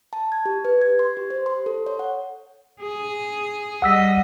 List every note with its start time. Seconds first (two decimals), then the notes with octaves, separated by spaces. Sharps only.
0.13 A5
0.32 G#6
0.46 G4
0.65 B4
0.81 G#6
0.99 C6
1.17 G4
1.30 C5
1.46 C6
1.66 A4
1.86 C#5
1.99 F#5
2.81 G#4
3.82 G3 D#5 F#5 E6 B6